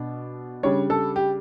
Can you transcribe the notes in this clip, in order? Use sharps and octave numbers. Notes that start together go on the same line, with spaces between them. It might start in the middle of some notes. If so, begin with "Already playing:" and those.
Already playing: B2 D4
C#3 G3 D4 C#5
A4
G4